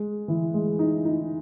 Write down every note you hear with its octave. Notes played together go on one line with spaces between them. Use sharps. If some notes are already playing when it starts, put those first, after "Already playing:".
Already playing: G#3
E3
G#3
D#4
D#4